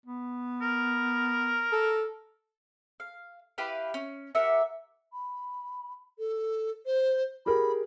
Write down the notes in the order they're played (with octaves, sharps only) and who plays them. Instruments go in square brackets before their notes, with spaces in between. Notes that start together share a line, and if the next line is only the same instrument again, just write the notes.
[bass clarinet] B3
[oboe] A#4
[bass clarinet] A4
[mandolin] F5
E4 G4 B4 F5
C#4
G4 A#4 E5 F#5
[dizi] B5
A4
C5
[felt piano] G4 G#4 A#4 [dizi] B5